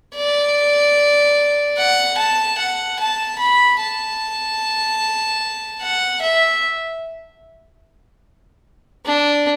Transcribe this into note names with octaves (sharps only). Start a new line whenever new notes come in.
D5
F#5
A5
F#5
A5
B5
A5
F#5
E5
D4